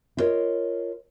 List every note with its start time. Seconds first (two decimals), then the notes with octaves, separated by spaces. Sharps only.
0.17 E4 F4 A#4 C#5 D#5